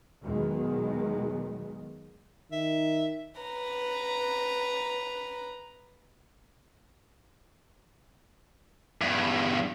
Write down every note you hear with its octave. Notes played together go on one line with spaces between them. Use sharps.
E2 B2 D#3 F#3 G#3
D#3 E5
B4 A#5
E2 G2